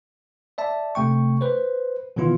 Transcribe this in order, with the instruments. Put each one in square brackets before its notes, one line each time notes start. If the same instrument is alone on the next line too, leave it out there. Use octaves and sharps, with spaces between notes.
[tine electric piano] D5 E5 A5
C3 A3 G5 C#6
B4 C5
B2 D#3 E3 B3 E4 F4